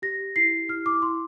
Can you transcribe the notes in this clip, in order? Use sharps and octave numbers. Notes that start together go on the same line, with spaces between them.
G4 A#6
G4
E4 C7
G4
E4 F6
E4 D6
E4 C6